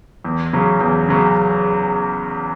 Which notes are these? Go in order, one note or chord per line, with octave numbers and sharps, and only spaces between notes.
E2
C#3 F#3 C#4
E2
C#3 F#3 C#4